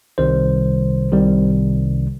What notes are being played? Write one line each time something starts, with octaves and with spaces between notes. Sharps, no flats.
C2 C3 D#3 G3 C5
C2 C3 D#3 G3